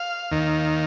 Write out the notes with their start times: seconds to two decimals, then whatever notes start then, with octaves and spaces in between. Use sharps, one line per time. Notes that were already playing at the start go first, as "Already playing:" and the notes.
Already playing: F5
0.31 D#2 D#3